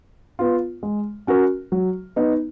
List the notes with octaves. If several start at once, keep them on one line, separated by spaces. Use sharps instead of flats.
B3 F4
G#3
C#4 F#4 A#4
F#3
B3 D#4